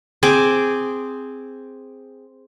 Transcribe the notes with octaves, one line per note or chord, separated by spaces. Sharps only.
C4 G#4 G#5 D6